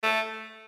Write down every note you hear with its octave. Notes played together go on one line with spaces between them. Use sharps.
A3